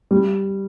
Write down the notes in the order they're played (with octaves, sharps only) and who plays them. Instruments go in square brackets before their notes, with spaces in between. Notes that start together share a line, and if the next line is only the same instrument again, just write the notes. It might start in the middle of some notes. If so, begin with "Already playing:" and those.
[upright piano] G3